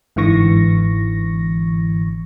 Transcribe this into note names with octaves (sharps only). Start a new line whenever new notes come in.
G1 G#2 D3 E3 C#6 A#6